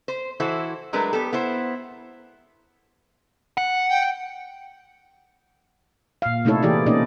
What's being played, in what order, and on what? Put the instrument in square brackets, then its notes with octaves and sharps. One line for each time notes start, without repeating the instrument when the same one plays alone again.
[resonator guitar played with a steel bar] C5
E3 E4 F#4 A4 C5
F#3 G#3 A3 D4 A#4 B4
B3 G4 A4
B3 E4 C5
[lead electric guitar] F#5
[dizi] G5
[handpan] A#2 F5
C3 A3 D#4 E4 A4 C#5
E3 A#3 E4 G4 G#4 D5
B2 A#3 C#4 D#4 D5 D#5